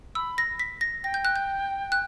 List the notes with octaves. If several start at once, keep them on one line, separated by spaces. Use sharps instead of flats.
B5 E6
A#6
B6
A#6
G5 A#6
G6
F#6
G6
F#6